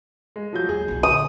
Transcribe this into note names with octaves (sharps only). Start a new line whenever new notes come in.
G#3
F3 F#3 G6
D#2 F#3 G#4
B1 E2
A#2 D3 D#6